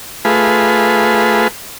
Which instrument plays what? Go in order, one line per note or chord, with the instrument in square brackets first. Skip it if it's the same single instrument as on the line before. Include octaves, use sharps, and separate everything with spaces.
[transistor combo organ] A3 F4 G#4 B4